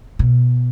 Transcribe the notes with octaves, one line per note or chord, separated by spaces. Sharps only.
B2